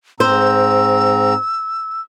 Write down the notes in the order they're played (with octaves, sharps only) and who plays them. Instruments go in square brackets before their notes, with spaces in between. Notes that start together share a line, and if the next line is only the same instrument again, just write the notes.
[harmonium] G#2 C4 A#5 [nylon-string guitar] C5 [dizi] E6